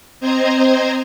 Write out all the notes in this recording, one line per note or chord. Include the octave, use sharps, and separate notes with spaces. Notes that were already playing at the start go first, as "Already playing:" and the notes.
C4 C5 D#5 A#5 G#6